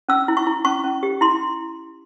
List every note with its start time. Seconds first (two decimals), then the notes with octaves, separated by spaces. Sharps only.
0.09 C#4 E6
0.28 E4
0.37 C#6
0.47 E4
0.65 C#4 C#6
0.84 C#4
1.03 G4
1.21 E4 C6